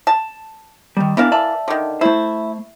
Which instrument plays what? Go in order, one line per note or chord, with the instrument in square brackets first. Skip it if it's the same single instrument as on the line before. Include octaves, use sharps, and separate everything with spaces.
[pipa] A5
[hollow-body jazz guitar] D#3 G3
[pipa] E3 A#4 F5 [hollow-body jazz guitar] B3 D4
[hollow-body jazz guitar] D5 E5 A5
[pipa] D3 D#3
[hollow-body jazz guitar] A3 C5 [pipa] E4